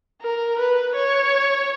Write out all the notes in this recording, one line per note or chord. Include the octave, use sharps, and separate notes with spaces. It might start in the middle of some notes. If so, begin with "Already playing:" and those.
A#4
B4
C#5